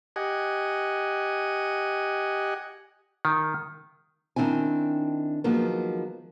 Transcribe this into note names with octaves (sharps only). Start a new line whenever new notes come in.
G4 D#5 F#5 G#5
D#3
D#3 C4 D4 E4 G#5
D#3 F3 F#3 G#3 A#3 B3